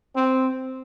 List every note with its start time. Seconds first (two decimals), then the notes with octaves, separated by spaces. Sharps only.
0.16 C4